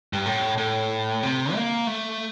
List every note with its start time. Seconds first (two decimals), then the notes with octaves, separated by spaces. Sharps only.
0.13 G2
0.26 A2
0.58 A2
1.23 C3
1.55 A#3
1.87 A3